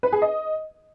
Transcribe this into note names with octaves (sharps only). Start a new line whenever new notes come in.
B4
G#4
D#5